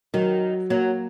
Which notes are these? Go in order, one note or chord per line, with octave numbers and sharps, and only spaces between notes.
D#3 F#3
F#3 A#3